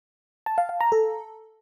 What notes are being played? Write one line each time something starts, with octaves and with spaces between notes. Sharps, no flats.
A5
F5
F5
A#5
A4